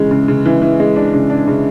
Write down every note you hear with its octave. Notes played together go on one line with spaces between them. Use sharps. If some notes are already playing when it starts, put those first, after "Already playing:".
Already playing: C#3 E3 G#3
C#3
C#3
E3
E3
G#3
D4
C#3
D4
C#3